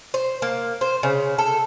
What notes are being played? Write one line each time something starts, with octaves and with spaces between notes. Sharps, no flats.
C5
A#3
C5
C#3
A4